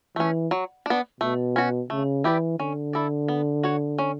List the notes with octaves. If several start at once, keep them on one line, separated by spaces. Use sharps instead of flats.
E3 A3 C#4
F#3
B3 D4
B2 A3
C#4 F#4
C#3 A3
E3 E4 G4 B4 D5
D3 C#4
E4 A4 D5
B3
F#4 C#5
C#4